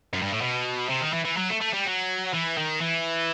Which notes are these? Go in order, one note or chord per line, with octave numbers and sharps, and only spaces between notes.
F#2
G2
A2
B2
C3
D#3
E3
E3
F#3
A3
A3
G3
F#3
E3
D#3
E3